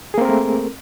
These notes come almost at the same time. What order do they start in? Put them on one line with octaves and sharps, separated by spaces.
G#4 A#3 C4 A#4 A3